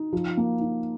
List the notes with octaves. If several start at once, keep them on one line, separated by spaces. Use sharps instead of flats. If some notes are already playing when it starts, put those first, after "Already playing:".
Already playing: D#4
F3
A#3
D#4